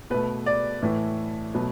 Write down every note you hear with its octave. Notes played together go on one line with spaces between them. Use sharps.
B2 A3 B4
D5
A2 E3 A3
B2 F#3 A3 B4